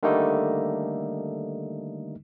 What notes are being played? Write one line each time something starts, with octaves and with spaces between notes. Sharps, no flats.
D3 D#3 G3 A3 A#3 D#4